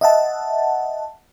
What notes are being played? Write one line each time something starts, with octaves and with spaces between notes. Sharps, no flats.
D#5 E5 F#5 A5